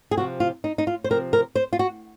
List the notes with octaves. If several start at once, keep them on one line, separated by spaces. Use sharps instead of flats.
G#4
C3 F3 C4 F#4
F4
D#4
D#4
F4
C5
C3 F3 C4 A#4
A#4
C5
F4
F#4